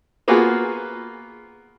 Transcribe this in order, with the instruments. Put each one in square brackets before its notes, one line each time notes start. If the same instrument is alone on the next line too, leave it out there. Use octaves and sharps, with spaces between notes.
[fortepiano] A#3 B3 F4 F#4 G#4 B4